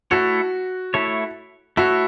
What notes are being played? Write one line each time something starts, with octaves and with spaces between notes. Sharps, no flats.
A3 E4 F#4 A4 C#5
A3 E4 A4 C#5
A3 E4 F#4 A4 C#5